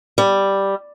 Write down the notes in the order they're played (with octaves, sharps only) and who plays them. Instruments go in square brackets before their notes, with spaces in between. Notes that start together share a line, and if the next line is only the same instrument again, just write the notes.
[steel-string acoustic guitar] G3